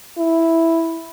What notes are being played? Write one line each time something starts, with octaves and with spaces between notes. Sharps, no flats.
E4